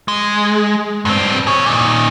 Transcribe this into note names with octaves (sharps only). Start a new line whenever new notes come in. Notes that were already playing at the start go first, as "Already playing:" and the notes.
G#3
G2 C4
G#4 C#5
A#2 D#3